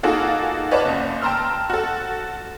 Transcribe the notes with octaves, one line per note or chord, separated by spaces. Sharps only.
A#3 D#4 F4 F#4 G#4 A4
B4 C#5 D5 F5 F#5 A5
F#1 C#2
G5 A5 A#5 C6 E6 F6
F#4 A4